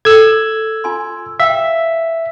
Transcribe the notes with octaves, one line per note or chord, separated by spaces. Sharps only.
A4 E6 G#6
F4 G#5 C6
E5 F5 G5